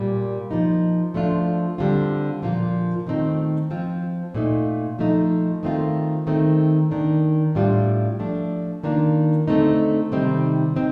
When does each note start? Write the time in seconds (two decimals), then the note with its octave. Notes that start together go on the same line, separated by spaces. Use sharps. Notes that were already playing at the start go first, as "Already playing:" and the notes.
Already playing: A#2 G3 A#3
0.51 F3 A#3 D#4
1.14 F3 A3 D4 F4
1.78 D3 G3 C4 F4
2.42 A#2 F3 A#3 F4
3.07 D#3 A3 C4 D#4
3.70 F3 C4 F4
4.35 A#2 A3 D#4
4.99 F3 A3 D#4
5.63 D#3 A3 C4 F4
6.27 D#3 A3 C4
6.91 D#3 A#3 D4
7.55 A2 G3 D4 F4
8.19 F3 A3 D4
8.84 D#3 A#3 D4 F4
9.48 D3 A3 C4 D#4
10.12 C3 D#3 G3 C4 D#4
10.76 C4 D#4